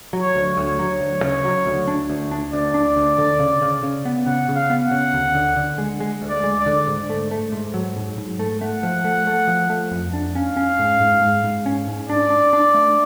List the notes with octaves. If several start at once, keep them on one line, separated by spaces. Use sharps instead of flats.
F#3
C#5
D2
C#5
D2
F#3
D2
C#3
F#3
D2
D4
D2
D4
D2 D5
D4
D2
D3
C#3
C#3
C#3
B3
C#3 F#5
C#3
F5
B3
F#5
C#3
D2
D3
D3
G#3
G#3
D2
D5
G#3
D5
D3
G#2
A3
A3
G#2
F#3
G#2
G#2
A3
A3 F#5
F3
A3
A3
F3
A3
F2
D4
C#4 F5
C#4
G#2
G#2
G#2
G#2
C#4
G#2
D4 D5
D4
D4
A3